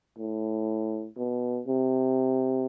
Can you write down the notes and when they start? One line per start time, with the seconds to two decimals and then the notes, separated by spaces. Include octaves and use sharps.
0.18 A2
1.17 B2
1.67 C3